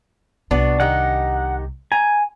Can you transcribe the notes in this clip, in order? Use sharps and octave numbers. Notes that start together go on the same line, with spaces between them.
C2 B3 D4 F#4
D#3 D#4 G4 F#5
G#5 A#5